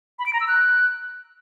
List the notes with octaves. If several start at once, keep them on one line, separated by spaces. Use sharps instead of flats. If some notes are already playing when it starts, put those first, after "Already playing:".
B5
D7
A#5
E6
F#6